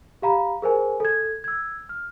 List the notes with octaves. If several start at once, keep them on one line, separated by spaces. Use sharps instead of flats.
G4 F5 A#5 B5
G#4 A#4 C5 G#5
A4 G#6
E6 G#6
F6